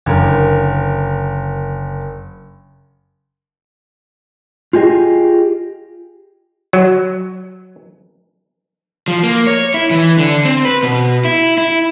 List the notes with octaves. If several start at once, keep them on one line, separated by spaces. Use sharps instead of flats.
F#1 D3 A#4
F4 G4 G#4 D#5
F#3
F3
A#3
C#5
E4
E3
D3
C4
B4
B2
E4
E4